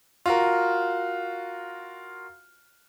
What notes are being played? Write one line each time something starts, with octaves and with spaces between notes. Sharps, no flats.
F4 F#4 A#4